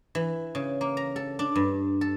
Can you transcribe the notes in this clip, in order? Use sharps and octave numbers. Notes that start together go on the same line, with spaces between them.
E3
C#3
A#3
A#5
A4
D4
G2
A4